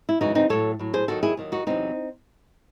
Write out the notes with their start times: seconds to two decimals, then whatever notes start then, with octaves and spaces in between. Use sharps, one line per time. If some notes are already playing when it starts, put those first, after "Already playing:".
0.09 E4
0.21 F#2 C#3 E3 G#3 D#4 F#4
0.35 C4 D#4
0.49 A2 F#3 A4 C#5
0.79 A2 F#3
0.94 G#4 C5
1.08 D#2 D#3 F#3 F#4 A4
1.23 E4 G#4
1.37 D#2 D#3 F#3
1.52 D#4 F#4
1.67 E2 C3 F#3 C4 D#4